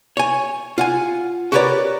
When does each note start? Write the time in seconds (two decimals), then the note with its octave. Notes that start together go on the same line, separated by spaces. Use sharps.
0.17 C#5 G#5
0.78 F4 F#5 G#5
1.52 F#4 G4 A#4 B4 C#5 D5